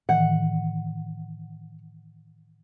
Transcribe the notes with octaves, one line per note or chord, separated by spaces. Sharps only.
A2 D#3 E3 F#5